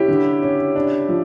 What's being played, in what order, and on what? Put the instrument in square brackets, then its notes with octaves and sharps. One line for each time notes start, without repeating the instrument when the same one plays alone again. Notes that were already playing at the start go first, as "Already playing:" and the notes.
Already playing: [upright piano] C#4 [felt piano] E4 G4
[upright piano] D3
C#4
D4
F3